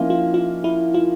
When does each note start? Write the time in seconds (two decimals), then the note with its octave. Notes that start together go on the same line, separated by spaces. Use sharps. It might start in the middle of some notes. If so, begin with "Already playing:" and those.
Already playing: F3 A#3 C#4 D#4 E4
0.10 F4
0.34 F4
0.64 E4
0.94 F4